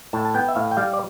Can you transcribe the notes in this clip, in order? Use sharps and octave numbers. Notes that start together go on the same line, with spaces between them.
A2 A5
A5
B3 G5
E5
A2 F5
G5
G3 F5
D5